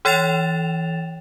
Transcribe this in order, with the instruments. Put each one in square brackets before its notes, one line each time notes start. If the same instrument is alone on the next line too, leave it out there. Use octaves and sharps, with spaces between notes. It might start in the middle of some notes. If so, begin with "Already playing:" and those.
[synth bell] E3 C#5 G5 A6 E7 F7